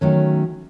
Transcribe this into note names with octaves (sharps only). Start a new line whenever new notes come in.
D#3 F#3 A3 C#4